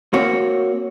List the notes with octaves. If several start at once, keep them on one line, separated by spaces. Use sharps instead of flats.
A#3 C4 F#4 C#5